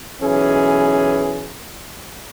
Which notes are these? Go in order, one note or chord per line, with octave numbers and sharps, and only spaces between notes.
B1 E3 C#4 G#4